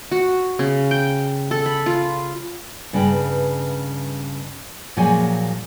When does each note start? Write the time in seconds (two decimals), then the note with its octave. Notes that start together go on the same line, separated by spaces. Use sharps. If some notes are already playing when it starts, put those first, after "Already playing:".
0.11 F#4
0.59 C#3
0.91 G5
1.51 A4
1.66 B5
1.86 F4
2.93 G2 C#3 B4 G5
4.97 A#2 F3 F#3 G#4 C#5 G#5